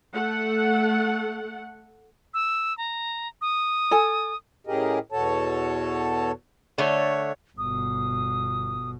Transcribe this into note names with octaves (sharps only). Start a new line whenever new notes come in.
A3 A4 F#5
E6
A#5
D#6
A4 G#5
A2 C#3 G4 G#4 A#4 D#5
E2 B2 F#4 A4 C#5 A5
D3 A3 C#5
G1 B2 D#6